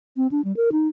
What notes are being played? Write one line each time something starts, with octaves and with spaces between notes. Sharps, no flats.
C4
D4
G3
A#4
D#4